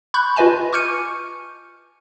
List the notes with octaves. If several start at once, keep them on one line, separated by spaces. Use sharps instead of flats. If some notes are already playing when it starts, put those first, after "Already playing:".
B5 C#6 F#6 G6
F4 B4 D#5 G#5 A5
C#6 D6 F6 G6 C#7 D#7